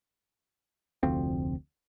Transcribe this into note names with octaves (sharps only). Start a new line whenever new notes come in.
F1 D2 F3 C4